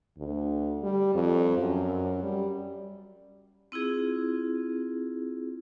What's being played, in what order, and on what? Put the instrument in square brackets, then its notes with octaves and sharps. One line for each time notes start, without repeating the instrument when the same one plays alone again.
[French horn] D2
G3
F2
F#2
G3
[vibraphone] C4 E4 F4 G#4